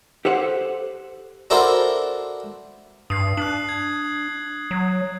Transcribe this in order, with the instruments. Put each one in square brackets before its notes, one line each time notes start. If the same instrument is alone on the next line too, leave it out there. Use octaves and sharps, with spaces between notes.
[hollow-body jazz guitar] G4 A4 C5 F#5
[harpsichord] D4 E4 F#4 A4 A#4 C5
[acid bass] G2 [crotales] D#6 C7
[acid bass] D4 [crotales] F#6 F#7
[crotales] G#6
[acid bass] F#3